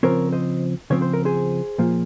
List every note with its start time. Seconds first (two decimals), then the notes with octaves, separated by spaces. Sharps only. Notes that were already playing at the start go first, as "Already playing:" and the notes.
0.03 C#3 F3 C4 A#4 C#5
0.32 C5 D#5
0.90 C#3 F3 C4 C#5
1.02 C5
1.13 A#4
1.25 G#4 C5
1.78 A#2 F3 A#3